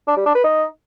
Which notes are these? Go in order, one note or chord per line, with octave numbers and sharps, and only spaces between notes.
D4
G3
D4
B4
D#4